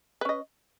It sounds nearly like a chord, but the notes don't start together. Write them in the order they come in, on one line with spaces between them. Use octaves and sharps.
B4 C#4 D#5